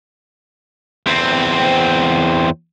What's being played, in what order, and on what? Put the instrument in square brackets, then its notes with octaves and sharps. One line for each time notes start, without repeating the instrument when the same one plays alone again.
[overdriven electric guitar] E2 C4